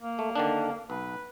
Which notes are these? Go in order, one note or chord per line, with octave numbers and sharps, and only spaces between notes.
A#3
A3
D3 D#3 D4
B1 B4